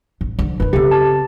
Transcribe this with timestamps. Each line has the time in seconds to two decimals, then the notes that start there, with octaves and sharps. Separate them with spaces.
0.21 A1
0.39 D3 F3
0.60 D#3 E3 B4
0.73 C#3 C4 G4 A4
0.91 A5